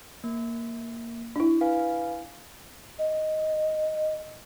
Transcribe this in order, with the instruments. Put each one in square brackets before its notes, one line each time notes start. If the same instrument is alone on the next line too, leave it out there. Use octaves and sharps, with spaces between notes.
[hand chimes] A#3
[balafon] D4 E4
[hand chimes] B4 F5 G#5
[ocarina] D#5